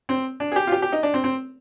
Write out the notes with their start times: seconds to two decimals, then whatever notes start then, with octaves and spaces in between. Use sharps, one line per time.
0.09 C4
0.40 D4
0.52 G#4
0.56 G4
0.67 F4
0.72 G4
0.82 G4
0.92 D#4
1.03 D4
1.14 C4
1.24 C4